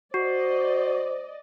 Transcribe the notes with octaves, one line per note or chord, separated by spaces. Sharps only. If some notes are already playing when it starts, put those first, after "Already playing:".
F#4 C5 D5 D#5